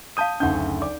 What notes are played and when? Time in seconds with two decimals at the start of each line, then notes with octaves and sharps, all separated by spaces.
0.17 F5 A5 D#6 G6 D#7
0.40 F#1 D2 C#4 D#4 F#5 G6
0.82 D5 D6